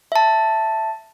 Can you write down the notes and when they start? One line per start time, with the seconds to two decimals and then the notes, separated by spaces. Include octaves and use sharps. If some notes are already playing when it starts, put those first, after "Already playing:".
0.12 E5 A5